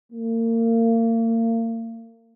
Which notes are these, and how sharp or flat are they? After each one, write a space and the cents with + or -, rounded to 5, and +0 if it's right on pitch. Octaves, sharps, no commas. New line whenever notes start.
A#3 -35